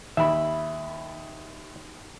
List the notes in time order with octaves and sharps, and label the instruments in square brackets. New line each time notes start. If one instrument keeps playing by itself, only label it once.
[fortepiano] D#2 B5 [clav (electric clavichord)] E5